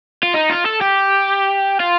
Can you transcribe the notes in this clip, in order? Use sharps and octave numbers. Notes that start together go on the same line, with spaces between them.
F4
D#4
F4
A4
G4
F4